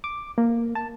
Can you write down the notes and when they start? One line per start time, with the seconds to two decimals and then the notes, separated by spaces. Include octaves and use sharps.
0.04 D6
0.38 A#3
0.75 A5